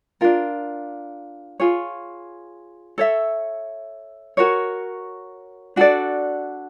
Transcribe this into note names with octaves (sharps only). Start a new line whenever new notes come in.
D4 F4 A#4
F4 G#4 C#5
A4 C#5 E5
F#4 A#4 C#5
D4 F#4 A4 D5